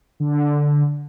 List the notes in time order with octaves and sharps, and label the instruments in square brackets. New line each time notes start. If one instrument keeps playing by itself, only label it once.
[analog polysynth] D3